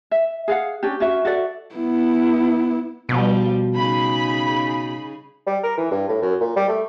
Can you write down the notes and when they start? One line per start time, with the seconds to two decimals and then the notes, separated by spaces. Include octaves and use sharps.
0.11 E5
0.48 G#4 F5 F#5
0.83 C#4 D4 G4
1.00 C#4 F#4 E5
1.25 F#4 A4 D5 E5
1.75 B3 E4
3.09 B2 F3 G3
3.75 C#3 D#4 G#4 B5
5.47 G3
5.63 A#4
5.78 E3
5.91 G2
6.09 A2
6.22 F#2
6.40 A#2
6.56 G3
6.68 A3